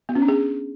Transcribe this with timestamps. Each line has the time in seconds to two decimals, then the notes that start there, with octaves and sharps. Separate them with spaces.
0.09 B3
0.15 C#4
0.22 D4
0.28 G#4